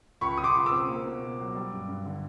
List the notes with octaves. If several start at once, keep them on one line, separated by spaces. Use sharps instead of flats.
C#2 B5 C#6
C#2 D#6
C6 D6
C#2
D6 E6
C4
A#3
B2
B2
F#3
G3
G2
G2
D3